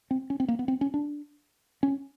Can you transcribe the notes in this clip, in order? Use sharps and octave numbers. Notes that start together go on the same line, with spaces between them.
C4
C#4
C4
A#3
B3
C4
C#4
D4
C#4